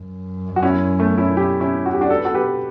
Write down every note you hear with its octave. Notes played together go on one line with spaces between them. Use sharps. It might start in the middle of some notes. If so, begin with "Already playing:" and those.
Already playing: F#2
F#4
C#4 E4
A3 C#4
C#4 E4
E4 G4
C#4 E4
F#4
G4
D4 F#4
A4
B4
F#4 A4
G4 B4